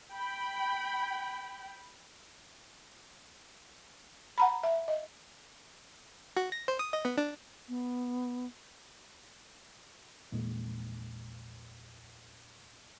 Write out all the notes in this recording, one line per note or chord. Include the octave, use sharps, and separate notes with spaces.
G5 B5
F#5 A#5 B5
E5
D#5
F#4
A#6
C5
D#6
D#5
B3
D4
B3
A#1 E2 A#2 G#3